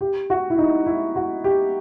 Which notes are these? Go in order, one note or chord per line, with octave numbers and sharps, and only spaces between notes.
G4
F#4
E4
D#4
E4
F#4
G4